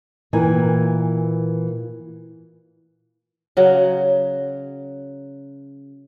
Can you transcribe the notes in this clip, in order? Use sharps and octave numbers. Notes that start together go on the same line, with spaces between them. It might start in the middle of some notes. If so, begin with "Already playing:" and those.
A#2 E3 A#4 G5 G#5
C#3 F#3